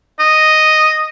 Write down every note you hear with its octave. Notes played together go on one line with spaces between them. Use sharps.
D#5